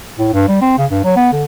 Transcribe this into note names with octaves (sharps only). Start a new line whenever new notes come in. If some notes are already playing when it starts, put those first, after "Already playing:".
A2
G2
G3
C4
C#3
G2
F#3
B3
D3